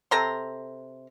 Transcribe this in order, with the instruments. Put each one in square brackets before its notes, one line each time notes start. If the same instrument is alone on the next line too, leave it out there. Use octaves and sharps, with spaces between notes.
[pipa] C3 A4 A#5 C6